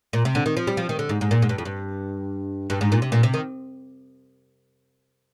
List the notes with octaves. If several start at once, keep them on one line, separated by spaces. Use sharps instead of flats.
A#2
C3
D3
D#3
F3
G3
F3
D#3
D3
G#2
G#2
A#2
G#2
G2
F2
G2
G2
G#2
A#2
C3
A#2
C3
D#3